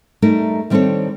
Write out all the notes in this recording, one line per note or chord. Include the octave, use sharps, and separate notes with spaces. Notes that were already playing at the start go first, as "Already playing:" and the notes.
G3 A3 D#4 A#4
D#3 G3 C4 D4 A4 C#5